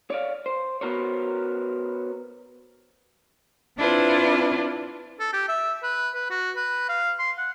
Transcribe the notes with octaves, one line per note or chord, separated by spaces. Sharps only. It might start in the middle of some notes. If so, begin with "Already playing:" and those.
C#5 D5 F5
C5
B3 F#4 A#4 C5 C#5
C4 D4 E4 F4 B4
A4
G4
E5
B4
B4
F#4
B4
F5
C6
F#5